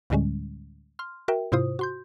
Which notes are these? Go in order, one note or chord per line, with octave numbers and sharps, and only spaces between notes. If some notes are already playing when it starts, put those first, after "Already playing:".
D2 A2 D3 G3 G#3 C#4
C6 F6
F#4 A#4 E5 G5
G#2 C3 E4 F4 C5 D#6
F#4 C6 G6